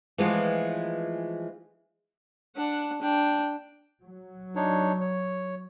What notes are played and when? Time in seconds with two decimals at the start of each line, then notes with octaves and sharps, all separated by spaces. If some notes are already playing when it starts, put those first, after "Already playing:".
0.18 E3 F3 G#3 A3 B3 F4
2.56 D4 F#5
3.01 D4 G5
4.04 F#3
4.56 D4 D#4 C#5
5.00 C#5